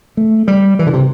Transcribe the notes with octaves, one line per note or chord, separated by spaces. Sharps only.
A3
G3
E3
D3
C3